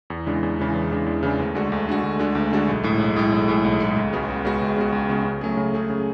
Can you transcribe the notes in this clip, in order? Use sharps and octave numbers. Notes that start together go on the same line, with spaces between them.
E2
C#3 E3 G#3 D4
E2
C#3 E3 G#3 D4
E2
C#3 E3 G#3 D4
E2
C#3 E3 G#3 D4
D2
D3 G#3 D4 F#4
D2
D3 G#3 D4 F#4
D2
D3 G#3 D4 F#4
D2
D3 G#3 D4 F#4
B1
A2 G#3
B1
A2 G#3
B1
A2 G#3
B1
A2 G#3
C#2
C#3 G#3 B3 F#4
C#2
C#3 G#3 B3 F#4
C#2
C#3 G#3 B3 F#4
C#2
C#3 G#3 B3 F#4
C#3
F#3 A3 C#4 G#4
C#3
F#3 A3 C#4 G#4
C#3